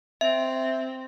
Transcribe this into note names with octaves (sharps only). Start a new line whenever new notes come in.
C4 E5